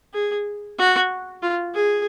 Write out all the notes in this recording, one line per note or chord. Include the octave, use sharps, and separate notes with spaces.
G#4
F#4
F4
G#4